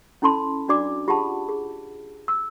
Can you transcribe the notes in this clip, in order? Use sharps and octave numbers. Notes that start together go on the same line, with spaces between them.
C#4 E4 A4 A5 B5 C6
D4 F#4 D5 D6
F4 G4 G#4 F#5 A5 B5
G#4
E6